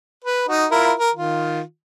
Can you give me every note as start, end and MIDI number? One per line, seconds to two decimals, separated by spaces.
0.24 0.48 71
0.49 0.66 63
0.49 0.66 66
0.71 0.93 64
0.71 0.93 65
0.71 0.93 70
0.99 1.10 70
1.15 1.61 51
1.15 1.61 65